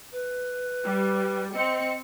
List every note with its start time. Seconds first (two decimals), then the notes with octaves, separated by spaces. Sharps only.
0.12 B4
0.84 G3
1.54 C4 D#5 C#7